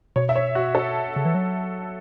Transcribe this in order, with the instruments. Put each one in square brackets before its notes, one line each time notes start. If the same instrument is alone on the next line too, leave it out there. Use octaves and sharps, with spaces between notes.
[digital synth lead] B2 [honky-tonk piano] C#5
[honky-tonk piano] E5
C#5
F#4
A4
[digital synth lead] C#3
E3
F#3